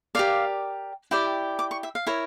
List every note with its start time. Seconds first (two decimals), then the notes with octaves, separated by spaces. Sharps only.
0.15 G4 A#4 D5 F5
1.11 E4 G4 D5 G5
1.59 D6
1.71 C#6
1.83 E5
1.95 F5
2.07 E4 A#4 C#5